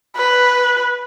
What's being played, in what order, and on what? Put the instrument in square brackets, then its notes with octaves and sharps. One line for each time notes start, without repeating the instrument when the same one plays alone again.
[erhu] B4